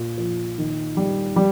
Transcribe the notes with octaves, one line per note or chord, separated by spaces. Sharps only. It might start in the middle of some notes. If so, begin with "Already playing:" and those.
Already playing: A#2
F3
D#3
G3
G3